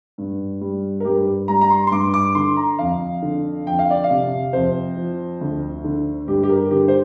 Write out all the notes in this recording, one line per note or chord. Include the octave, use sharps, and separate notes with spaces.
G2
G3
A#4
G2 G4
G3 A#5
A#5
C6
C6
G2 D6
D6
D3 C6
A#5
F2 F5
D3
F2 G5
F5
D5
F5
C3
F2 C5
F3
D2
D3
G2 G4
G4
A#4
D3 G4
C5